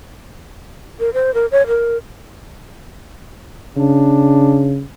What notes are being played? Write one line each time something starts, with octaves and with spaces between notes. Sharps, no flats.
A#4
C5
A#4
C#5
A#4
C#3 D4